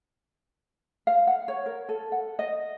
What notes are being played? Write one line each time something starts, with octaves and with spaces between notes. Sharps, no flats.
F5
F#5
C#5
A#4
A4
F#5
D#5